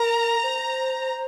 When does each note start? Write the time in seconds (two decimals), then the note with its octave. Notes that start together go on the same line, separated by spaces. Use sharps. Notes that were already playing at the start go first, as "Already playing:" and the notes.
Already playing: A#4 A#5
0.43 C5